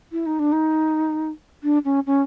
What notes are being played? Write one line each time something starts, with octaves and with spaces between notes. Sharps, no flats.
E4
D#4
D4
D#4
D4
C#4
C#4